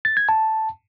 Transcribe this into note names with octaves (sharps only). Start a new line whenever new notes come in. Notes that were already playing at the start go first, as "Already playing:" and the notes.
A6
G#6
A5